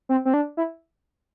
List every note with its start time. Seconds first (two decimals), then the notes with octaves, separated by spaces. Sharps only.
0.09 C4
0.25 C4
0.34 D4
0.57 E4